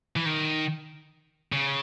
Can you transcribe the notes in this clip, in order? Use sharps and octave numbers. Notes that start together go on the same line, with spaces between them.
E3
D#3
C#3